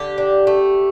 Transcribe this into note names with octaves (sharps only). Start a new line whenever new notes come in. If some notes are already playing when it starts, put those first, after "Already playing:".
Already playing: D3 G4
D4
A3